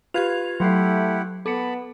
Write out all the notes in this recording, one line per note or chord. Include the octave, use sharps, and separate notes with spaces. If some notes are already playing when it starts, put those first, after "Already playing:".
F4 G4 B4 F5 G#6 F7
F#3 A3 E4 G4 F#5 C6 C7
B3 A4 A5 B5 D6 C#7